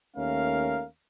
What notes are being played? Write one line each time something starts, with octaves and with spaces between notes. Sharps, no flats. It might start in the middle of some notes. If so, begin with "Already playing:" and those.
D#2 A3 C#4 A#4 F5